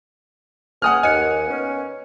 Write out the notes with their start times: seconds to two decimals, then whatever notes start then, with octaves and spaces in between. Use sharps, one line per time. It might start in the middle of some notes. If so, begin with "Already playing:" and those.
0.82 C#3 B4 F#5 G#5 D#6 F6
1.03 D#2 D#5 G#5 F#6 C#7
1.48 B3 C#4